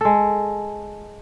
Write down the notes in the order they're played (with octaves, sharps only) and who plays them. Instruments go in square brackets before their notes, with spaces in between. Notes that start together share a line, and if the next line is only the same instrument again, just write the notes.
[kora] G#3 A4